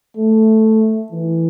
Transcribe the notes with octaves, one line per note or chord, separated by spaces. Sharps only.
A3
E3